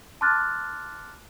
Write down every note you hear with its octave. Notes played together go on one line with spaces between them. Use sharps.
A5 C6 D6 F6 F#6 A6